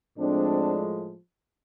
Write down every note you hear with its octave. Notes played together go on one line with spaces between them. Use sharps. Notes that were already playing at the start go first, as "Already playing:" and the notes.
A2 F3 G#3 C4 D4